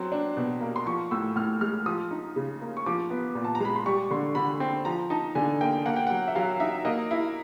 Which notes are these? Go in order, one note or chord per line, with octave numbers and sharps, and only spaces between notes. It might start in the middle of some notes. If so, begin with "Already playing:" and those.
Already playing: F#3 C4 C6
D4
B2
A#3
C6
F3 C#6
A2 E6
A2 F6
G#3 F6
F3 D#6
D#4
C#3
A#3
C#6
F3 D6
B3
A#2
A5
A#5
G#3 B5
C6
G3 C#6
D3 C6
D3 B5
C4
F3 A#5
D#4 A5
D3 G#5
A#3 G5
A#3 F#5
G5
F#3 F#5
E5
F#3 F5
D#4 E5
A#3 D#5
E4